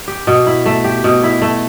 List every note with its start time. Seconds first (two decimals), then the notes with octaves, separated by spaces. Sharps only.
0.08 G4
0.27 B2
0.46 E4
0.66 A3
0.84 G4
1.04 B2
1.23 E4
1.42 A3